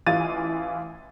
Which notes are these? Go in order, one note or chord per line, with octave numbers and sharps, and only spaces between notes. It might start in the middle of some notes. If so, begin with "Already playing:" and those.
A1 E3 F4 F5 A6 D#7